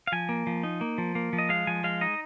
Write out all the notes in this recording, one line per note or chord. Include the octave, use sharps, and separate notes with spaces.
F5
F3 G#5
A#3
F3
D#4
A#3
F3
A#3
F3
D#5
G#3 F5
F3 G#5
G#3 F5
D#4 D#5